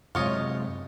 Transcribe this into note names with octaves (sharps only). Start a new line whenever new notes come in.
F#2 C3 G#3 F4 C#5 D#5